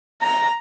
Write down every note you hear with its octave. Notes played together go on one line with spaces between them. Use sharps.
A#5